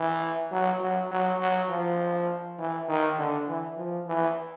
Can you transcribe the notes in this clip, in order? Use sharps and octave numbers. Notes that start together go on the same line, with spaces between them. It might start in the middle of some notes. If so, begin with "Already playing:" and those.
Already playing: E3
F#3
F#3
F#3
F#3
F3
E3
D#3
D3
E3
F3
E3